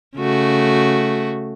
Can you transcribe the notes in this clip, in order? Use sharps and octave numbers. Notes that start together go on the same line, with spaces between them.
C#3 A3 F#4